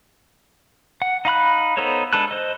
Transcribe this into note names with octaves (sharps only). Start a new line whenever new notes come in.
F#5
D#4 F5 B5 F#6
B3 D#4 A4 C5 C#5
G#3 D4 A4 B4 F#6
C5 D#5